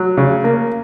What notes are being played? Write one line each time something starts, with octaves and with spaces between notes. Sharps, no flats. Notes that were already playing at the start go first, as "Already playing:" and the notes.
Already playing: F#3
C#3
A#3